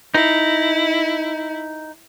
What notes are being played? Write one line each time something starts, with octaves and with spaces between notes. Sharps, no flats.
D#4 E4